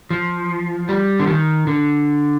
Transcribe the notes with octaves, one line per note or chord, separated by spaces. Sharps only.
F3
G3
D3
D#3
D3